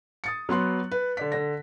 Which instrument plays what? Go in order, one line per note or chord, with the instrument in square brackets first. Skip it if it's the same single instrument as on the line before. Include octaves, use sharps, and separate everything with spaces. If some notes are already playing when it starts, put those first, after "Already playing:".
[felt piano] D#6 A6 C#7
F#3 B3 C6 F#6
B4
D3 D5 B6
D3 A#6